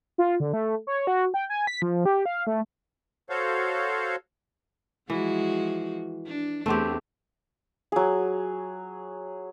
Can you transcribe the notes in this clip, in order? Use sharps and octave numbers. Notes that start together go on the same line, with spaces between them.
F4
D3
A3
C#5
F#4
G5
G#5
B6
F3
G4
F5
A3
F#4 A4 C5 C#5 F5
E3 F3 G#3 F#4
D4
E2 A3 C4 G4
F#3 G#4